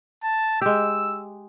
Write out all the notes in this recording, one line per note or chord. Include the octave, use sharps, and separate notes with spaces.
A5
G#3 G4 E6